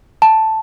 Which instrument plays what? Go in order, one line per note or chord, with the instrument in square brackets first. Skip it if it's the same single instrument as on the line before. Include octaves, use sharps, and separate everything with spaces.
[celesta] A5